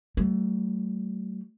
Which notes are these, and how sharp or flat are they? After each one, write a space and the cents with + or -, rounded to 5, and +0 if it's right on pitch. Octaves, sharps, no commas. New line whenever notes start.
F#3 +40 A3 +0